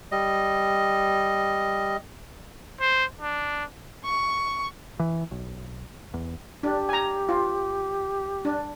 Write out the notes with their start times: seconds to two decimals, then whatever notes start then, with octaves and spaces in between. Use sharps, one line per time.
0.11 G3 D#5
2.80 C5
3.21 D4
4.05 C#6
4.99 E3
5.31 B1
6.14 E2
6.63 D4 G4
6.89 G#5 A#5
7.29 F4
8.45 D4